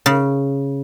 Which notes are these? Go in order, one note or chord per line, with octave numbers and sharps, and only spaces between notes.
C#3